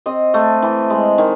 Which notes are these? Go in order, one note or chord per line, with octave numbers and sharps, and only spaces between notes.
C4 D#5
A3
E3
G#3
D#3